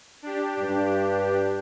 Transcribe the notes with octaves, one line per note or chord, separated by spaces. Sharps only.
D4 G4
G2